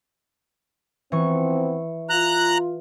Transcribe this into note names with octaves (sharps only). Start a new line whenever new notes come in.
E3 F3 B3 C4 C#6
F4 A#5 F#6